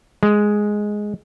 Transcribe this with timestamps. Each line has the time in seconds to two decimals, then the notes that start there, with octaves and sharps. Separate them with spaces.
0.23 G#3